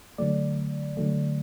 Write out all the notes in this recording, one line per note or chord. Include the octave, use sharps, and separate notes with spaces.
D3 F#3 A3 D5
D3 F#3 A3